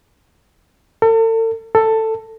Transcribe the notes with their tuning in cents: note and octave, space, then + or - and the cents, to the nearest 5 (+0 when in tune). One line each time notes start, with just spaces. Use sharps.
A4 +40
A4 +10